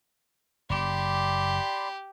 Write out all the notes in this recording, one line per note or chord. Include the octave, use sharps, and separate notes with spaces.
F#1 G4 D5 B5 C6